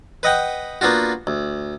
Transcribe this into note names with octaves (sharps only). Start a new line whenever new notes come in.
B4 D#5 F#5 G5
A#3 B3 D4 F4 F#4
D2